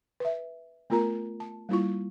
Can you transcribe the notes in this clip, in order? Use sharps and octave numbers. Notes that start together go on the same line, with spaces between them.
B4 E5
A3 B3 F4 A#4 A#5
A5
G3 A#3 E4 F4 C#6